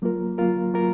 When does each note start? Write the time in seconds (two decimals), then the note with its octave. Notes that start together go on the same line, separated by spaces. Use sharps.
0.02 F#3 A#3 F4 A#4
0.38 F#3 A#3 F4 A#4
0.74 F#3 A#3 F4 A#4